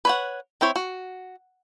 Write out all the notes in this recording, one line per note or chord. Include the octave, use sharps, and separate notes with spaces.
B4 C#5 F#5
C4 E4 C5 C#5
F#4